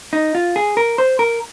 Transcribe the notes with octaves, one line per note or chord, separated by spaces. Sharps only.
D#4
F4
G#4
A#4
C5
A#4